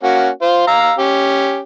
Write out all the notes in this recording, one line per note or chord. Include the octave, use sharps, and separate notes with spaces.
A#3 C#4 F#4
F4 C5
F5 A#5 E6
C#4 G4